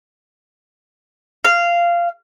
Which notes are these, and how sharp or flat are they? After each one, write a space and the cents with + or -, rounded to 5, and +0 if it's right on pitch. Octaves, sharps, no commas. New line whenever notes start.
F5 -15